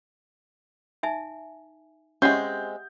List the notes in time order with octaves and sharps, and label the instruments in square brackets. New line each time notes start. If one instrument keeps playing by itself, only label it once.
[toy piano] D#4 E5 G#5
[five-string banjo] G#3 C4 [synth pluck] C#4 [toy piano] G4 E5 F#5 [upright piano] G6